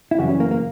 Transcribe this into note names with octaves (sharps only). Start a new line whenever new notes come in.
E4
F#2 C#3 E3 G3 F#4
C#4
A#3
A#3